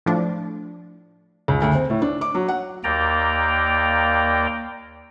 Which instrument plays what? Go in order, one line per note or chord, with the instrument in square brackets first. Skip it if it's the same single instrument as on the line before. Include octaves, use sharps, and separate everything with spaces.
[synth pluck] A2 F3 D4
[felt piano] C#2
D2
C4
A2
D4
D6
F#3
F#5
[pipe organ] D#2 A#3 D5 G5 A#5